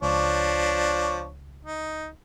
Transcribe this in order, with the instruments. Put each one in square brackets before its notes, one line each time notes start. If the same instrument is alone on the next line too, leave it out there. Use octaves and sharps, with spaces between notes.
[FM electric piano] C#2 [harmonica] F3 D4 C#5
[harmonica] D#4